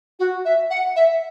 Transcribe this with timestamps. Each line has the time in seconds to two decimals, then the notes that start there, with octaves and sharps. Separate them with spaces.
0.19 F#4
0.45 E5
0.70 F#5
0.96 E5